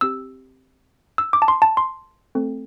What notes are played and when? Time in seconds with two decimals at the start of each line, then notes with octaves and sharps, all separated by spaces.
0.01 C4 G4 E6
1.18 E6
1.33 D6
1.42 A5
1.48 C6
1.62 A5
1.77 C6
2.35 A3 C4 A4